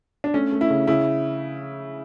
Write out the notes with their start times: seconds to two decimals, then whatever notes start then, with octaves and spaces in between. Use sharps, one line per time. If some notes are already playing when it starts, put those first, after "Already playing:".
0.24 D4
0.34 A3 C#4
0.52 A3
0.61 E4
0.70 C#3
0.87 C#3 E4